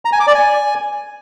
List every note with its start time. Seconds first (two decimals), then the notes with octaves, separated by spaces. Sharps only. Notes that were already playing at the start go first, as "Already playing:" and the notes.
0.05 A#5
0.12 G#5
0.20 D6
0.27 D5
0.35 G#5